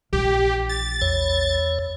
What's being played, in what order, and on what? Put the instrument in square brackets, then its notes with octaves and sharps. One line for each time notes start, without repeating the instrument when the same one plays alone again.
[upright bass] A#1 E3 [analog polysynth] G4
[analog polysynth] A6
[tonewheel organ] E2 C#5